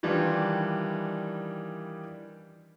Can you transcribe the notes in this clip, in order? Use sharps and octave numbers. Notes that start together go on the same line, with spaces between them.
D#3 E3 G3 D4 F4